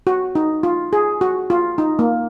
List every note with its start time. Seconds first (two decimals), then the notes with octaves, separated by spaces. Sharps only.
0.07 F#4
0.35 D#4
0.63 F4
0.93 G#4
1.21 F#4
1.50 F4
1.78 D#4
1.99 A#3